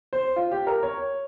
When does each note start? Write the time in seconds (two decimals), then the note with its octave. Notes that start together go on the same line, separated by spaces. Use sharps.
0.13 C5
0.36 F4
0.51 G4
0.67 A#4
0.83 C#5